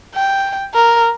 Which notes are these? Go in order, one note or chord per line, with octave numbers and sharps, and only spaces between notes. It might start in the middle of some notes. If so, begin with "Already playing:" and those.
G5
A#4